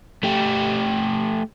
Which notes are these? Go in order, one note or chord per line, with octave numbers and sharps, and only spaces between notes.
A3 G4